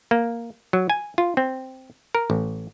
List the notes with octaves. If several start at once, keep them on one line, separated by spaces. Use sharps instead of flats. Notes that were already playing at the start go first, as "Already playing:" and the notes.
A#3
F#3
G#5
F4
C4
A#4
A1